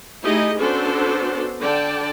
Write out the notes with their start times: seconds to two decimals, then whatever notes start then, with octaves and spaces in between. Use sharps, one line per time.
0.24 A3 D#4 E4 G4 G#4 D#5
0.58 B3 C#4 D4 F#4 A4 C5
1.62 D3 D5 G5 A5